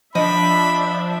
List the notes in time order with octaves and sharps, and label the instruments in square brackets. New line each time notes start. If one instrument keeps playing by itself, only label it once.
[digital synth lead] F3 [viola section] D4 E5 [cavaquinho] D#5 D#6 [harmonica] B5